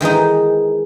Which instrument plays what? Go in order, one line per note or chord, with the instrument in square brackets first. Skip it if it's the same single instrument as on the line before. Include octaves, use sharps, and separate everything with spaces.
[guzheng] D#3 E3 G#3 D#4